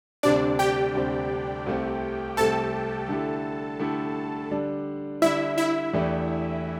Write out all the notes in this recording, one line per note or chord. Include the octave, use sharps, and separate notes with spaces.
D2 C3 G3 C4 D4 D5
G4 G5
D2 C3 G3 C4
C2 C3 A3 C4
C2 C3 A3 C4 A4 A5
D3 A3 E4 G4
D3 A3 E4 G4
D3 G3 D4
D3 G3 D4 E4 E5
E4 E5
E2 E3 A3 D4 G4